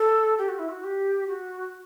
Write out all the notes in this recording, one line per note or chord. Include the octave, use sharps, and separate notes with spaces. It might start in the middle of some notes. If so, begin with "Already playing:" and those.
Already playing: A4
G4
F#4
E4
F#4
G4
F#4